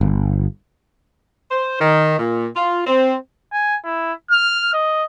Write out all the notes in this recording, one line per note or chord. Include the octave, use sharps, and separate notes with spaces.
G1
C5
D#3
A#2
F4
C4
G#5
E4
F6
D#5